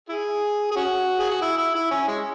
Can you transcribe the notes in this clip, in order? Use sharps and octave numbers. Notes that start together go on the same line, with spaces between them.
E4 G#4
G#4
C#4 F#4
G#4
F#4
E4
E4
E4
C#4
G#3